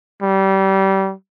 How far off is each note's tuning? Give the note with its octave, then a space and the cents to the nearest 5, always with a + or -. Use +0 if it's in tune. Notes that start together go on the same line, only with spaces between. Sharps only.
G3 -25